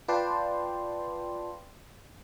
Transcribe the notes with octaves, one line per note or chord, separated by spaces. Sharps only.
F4 B4 D5 G5 A5 C6